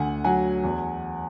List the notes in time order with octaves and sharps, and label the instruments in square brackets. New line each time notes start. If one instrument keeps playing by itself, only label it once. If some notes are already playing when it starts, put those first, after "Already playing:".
Already playing: [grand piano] D2 F#5 G#5
F#3 F#5 G#5
E2